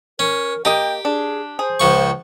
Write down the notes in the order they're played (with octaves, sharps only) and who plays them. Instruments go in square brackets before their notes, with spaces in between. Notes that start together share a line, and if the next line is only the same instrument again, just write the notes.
[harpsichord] C#4 [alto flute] A#4
[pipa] A#3 D#5 A#5 [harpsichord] G4 [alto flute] G5
[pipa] D4 [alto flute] G#4
[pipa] G#4 [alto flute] C5
[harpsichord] C#2 F3 C#6